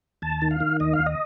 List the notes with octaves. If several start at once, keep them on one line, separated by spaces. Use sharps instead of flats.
D#2 A5
D#3
F5
D#3
D#2 D#5
F5
D#2
D#5